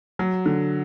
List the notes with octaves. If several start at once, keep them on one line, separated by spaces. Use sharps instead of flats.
F#3
D3